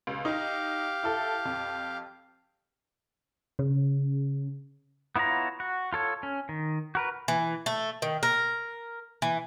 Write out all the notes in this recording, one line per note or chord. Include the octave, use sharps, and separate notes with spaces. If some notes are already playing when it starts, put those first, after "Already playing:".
C#2
D#4 G4 F5 D6
E4 A4
F2
C#3
B3 E4 F4 C#5 A#5
F#4
F4 A4 C#5
C#4
D#3
F#4 A#4 B4
E3
A3
D#3
A#4
E3